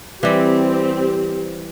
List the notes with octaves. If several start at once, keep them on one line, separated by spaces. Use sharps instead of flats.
E3 G3 C4 G4